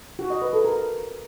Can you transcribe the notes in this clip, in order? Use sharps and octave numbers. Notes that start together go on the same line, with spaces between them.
F#4
D#5
B4
A4
A#4